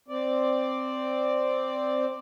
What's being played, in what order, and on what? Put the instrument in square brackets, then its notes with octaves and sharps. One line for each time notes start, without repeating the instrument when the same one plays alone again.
[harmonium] C4 D5